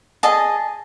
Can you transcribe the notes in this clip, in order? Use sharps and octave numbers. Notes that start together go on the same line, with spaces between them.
G#4 D#5 A5